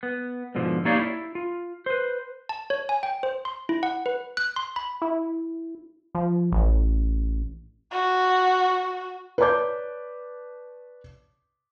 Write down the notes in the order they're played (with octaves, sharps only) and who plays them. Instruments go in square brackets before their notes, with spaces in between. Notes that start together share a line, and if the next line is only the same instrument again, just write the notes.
[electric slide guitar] B3
G#2 B2 D3 F3
A#3 D#4 G4 C#5 D5 F5
E4
F4
B4 C5
[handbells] A5
C#5
G#5
G5
C5
C6
E4
F#5
B4
F#6
C6
B5
[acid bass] E4
F3
A1
[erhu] F#4
[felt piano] B4 C#5 D5 A5 D6 G6